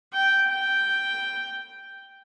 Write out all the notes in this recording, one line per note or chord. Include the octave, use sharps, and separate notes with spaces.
G5
G5